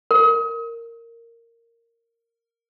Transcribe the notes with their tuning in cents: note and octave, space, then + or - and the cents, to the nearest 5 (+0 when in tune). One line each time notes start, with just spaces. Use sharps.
A#4 -10